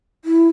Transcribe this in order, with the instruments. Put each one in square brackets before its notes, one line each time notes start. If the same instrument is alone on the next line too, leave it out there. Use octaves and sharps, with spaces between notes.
[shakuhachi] E4